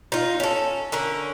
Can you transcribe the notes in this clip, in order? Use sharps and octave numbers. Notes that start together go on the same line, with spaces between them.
D#4 F4
C#4 A4
D3 C#4 A#4